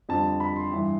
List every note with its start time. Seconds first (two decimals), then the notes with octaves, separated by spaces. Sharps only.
0.09 F2 D3 G3 A5
0.40 B5
0.56 C6
0.71 G2 E3 G3